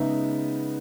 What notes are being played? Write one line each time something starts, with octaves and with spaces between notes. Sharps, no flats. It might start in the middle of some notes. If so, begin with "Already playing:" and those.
Already playing: C#3 G#3 B3 D#4 E5